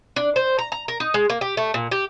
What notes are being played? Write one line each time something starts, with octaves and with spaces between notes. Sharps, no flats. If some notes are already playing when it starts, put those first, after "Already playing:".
D4
C5
A#5
A#5
A#4
D#4
G#3
A#3
G4
A3
A#2
G4